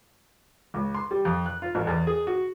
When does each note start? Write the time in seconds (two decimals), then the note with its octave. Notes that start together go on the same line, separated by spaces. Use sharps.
0.74 C#2
0.95 C6
1.11 G3
1.25 F2
1.46 F#6
1.62 F4
1.75 A1
1.87 E2
2.07 G#4
2.27 F#4